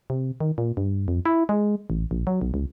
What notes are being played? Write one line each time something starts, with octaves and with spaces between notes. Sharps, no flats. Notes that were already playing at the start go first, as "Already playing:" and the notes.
C3
D#3
A#2
G2
F2
E4
G#3
A1
A#1
F#3
B1
C#2